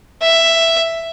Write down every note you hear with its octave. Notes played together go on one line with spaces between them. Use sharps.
E5